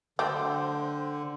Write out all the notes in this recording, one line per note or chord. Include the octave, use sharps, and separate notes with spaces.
D3 F#3 A3 C5 G5 D6